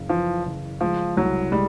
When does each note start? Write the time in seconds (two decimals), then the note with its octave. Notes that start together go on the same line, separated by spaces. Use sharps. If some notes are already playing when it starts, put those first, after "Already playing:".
Already playing: F#1 C#3
0.09 E3 F3
0.46 C#3
0.81 F3 G#3
1.17 C2 F#3
1.52 G3 G#3